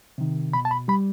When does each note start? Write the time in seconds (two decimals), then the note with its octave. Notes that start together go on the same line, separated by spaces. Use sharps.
0.18 C3 D#3
0.53 B2 B5
0.65 A5
0.71 B5
0.88 G3 B5